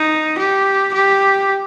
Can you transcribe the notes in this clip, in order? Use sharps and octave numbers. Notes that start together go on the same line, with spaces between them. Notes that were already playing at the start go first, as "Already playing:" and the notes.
Already playing: D#4
G4
G4